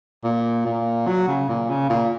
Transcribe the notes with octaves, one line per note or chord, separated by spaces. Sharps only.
A#2
A#2
F#3
C#3
A#2
C#3
A#2